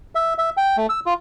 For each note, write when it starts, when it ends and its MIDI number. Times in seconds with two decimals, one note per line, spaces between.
0.15 0.34 76
0.38 0.50 76
0.57 0.76 79
0.77 0.87 57
0.89 1.00 88
1.06 1.14 65